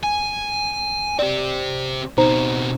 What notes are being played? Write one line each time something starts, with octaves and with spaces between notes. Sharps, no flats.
G#5
C4 G4 D5
B2 C4 D#4 C5 A#5